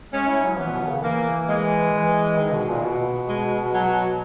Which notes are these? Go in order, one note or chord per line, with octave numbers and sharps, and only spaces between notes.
G#3 C#4
E4
F#3
E3 B3
A#2
B2
D#3
C#3
E3 A#3
G#3
E3
D#3
B2
A#2
B2
G#3
F#3